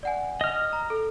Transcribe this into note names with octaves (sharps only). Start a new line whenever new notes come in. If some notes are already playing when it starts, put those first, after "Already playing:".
D5 F#5 G#5
D#5 F6
A#5
A4